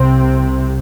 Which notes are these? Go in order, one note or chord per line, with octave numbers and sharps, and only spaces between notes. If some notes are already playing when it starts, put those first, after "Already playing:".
Already playing: C2 C3 C4